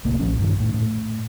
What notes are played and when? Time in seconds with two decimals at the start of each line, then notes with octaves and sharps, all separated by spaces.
0.05 D1 C2 A2 A#3
0.19 A#1 A#2 F3 C#4
0.39 G2 D#3
0.60 A2
0.74 A2